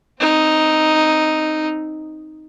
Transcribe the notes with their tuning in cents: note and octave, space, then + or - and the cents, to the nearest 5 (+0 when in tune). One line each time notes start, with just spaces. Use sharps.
C4 +5 D#4 +0